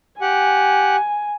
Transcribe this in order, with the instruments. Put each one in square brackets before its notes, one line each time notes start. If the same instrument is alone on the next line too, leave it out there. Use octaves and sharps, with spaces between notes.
[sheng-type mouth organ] G4 F#5 [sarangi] G#5